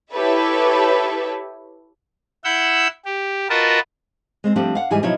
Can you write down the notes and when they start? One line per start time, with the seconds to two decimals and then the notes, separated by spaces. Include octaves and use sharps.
0.12 E4 G4 A4 B4 C#5 E5
2.45 E4 F#5 E6 G6
3.05 G4
3.50 F4 F#4 A#4 B4 D#5 A5
4.44 G#3 C4 C5
4.56 F3 G3 A3 C4 D4
4.75 F5 F#5
4.90 G#2 E3 G3 G#4 G#5
5.03 B2 F3 F#3 D#4 E4 C#5